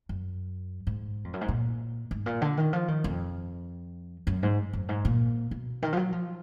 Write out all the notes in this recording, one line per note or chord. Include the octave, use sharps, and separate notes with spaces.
F#2
G#2
F2
F#2
G#2
A#2
G#2
A#2
D3
D#3
F3
D#3
F2
F#2
G#2
F#2
G#2
A#2
B2
D#3
F3
F#3
F3